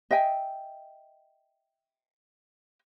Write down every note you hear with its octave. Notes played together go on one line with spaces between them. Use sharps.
D#5 E5 G5 G#5